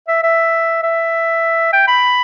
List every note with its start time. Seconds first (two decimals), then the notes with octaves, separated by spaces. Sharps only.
0.08 E5
0.23 E5
0.83 E5
1.73 G5
1.88 B5